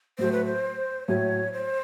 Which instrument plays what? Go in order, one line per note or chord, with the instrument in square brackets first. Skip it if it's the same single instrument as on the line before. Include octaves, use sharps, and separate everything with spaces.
[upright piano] A2 F#3 A3 [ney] C5
[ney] B4
C5
[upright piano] A2 F#3 A3 [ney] C#5
[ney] C5